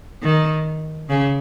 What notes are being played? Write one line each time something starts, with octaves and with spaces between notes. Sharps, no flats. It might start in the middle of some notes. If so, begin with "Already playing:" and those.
D#3
C#3